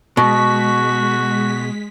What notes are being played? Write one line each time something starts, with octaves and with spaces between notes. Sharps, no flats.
B2 G#3 F#4 C#6 B6